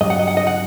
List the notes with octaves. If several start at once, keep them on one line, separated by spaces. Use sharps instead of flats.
G2 F#3 D#5
F#5
D#5
F#5
D#5
F#5